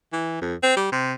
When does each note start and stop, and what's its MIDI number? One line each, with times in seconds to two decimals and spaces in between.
0.13 0.40 52
0.42 0.55 41
0.63 0.75 60
0.77 0.88 55
0.92 1.14 48